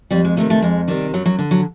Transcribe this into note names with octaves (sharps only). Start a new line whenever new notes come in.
F2 G3
G#3
C3 D#3 A3
A3
F2 G#3
C3 D#3 G3
F#2 F#3
F#3
D3
F#3